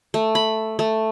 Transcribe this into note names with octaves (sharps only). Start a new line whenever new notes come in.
A3
B5
A3